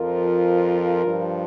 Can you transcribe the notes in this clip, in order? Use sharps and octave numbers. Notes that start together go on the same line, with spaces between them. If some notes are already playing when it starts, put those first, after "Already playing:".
Already playing: F2 F3 F4 A#4
G2 F3